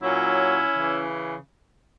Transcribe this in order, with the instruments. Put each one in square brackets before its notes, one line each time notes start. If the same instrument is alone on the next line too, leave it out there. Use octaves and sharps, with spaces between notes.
[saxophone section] A#2 F#3 C#4 E4
C#3 E3